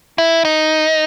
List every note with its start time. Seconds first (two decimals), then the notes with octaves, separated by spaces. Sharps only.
0.18 E4
0.45 D#4